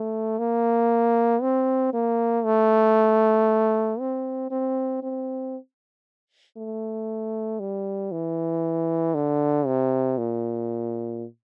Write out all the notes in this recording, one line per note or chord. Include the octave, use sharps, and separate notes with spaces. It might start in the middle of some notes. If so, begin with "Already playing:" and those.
Already playing: A3
A#3
C4
A#3
A3
C4
C4
C4
A3
G3
E3
D3
C3
A#2